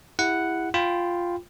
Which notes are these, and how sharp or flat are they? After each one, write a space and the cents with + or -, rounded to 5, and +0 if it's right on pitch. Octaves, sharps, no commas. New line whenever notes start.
E4 +0 G4 +35 F#5 +0
F4 +0 G5 +0 B5 +20